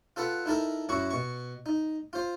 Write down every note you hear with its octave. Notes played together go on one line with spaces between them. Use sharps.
F4 A4 B4 F#5
D#4 E4 A4 A#4
F#2 E4 F#4 C#6
B2 C#6
D#4
F4 C5